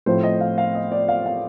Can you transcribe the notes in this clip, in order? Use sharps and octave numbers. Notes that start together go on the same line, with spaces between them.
A2 F3 C4 F4 C5
D#5
F5
F5
D#5
D5
F5
F5